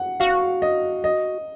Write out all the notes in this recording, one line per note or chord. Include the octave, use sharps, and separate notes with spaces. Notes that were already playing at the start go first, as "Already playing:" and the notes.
Already playing: F#5
F#4 F5
D#5
D#5